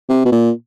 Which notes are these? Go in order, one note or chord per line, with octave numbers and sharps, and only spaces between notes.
C3
B2
A#2